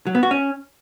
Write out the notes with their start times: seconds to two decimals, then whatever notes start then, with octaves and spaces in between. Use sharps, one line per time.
0.07 F#3
0.15 B3
0.23 F#4
0.31 C#4